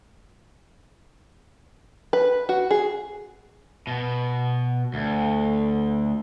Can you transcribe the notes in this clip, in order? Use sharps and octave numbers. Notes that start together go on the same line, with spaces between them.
B4
F#4
G#4
B2
D2